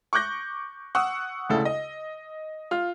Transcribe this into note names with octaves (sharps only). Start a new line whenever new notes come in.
C#6 D6 F#6 G6 A#6
F#5 C#6 D#6 E6
D2 C#3 E4 A4
D#5
F4 F6